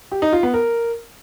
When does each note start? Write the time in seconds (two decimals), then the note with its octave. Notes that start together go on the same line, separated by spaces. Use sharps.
0.12 G4
0.22 D#4
0.33 F4
0.43 B3
0.54 A#4